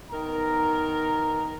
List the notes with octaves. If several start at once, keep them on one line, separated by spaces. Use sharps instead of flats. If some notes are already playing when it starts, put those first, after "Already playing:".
D#3 B3 A#4 A#5